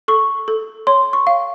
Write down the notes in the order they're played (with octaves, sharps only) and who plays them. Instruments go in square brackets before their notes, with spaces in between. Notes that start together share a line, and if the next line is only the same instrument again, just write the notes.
[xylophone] A4 C#6
A4
C#5 C6
C#6
F5